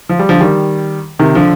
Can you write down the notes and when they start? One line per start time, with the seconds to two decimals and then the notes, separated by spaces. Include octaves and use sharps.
0.09 F3
0.19 G3
0.29 D3 F3
0.41 D#3 G3
1.19 C3 D#3
1.35 D3 F3